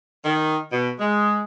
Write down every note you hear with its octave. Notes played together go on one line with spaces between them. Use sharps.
D#3
B2
G#3